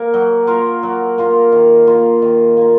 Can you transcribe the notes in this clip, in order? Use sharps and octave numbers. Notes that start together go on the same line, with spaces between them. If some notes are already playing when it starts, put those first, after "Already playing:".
Already playing: A#3 A#4
F#3
A#3 F4 A#4
F#3
A#3 F4 A#4
D#3
A#3 F4
D#3
A#3 F4